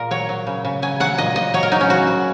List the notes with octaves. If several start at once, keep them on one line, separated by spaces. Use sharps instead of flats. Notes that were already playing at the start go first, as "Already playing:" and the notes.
Already playing: A#2 G#4 A#4
F#3 C#5
F#3
C#3
C#3
F#3 G#5
F#3 F#5
A#2 D#5
A#2 D#5
F#3 C#5
A#4
F#3 D#4
C#4
C#3 F#4
C#3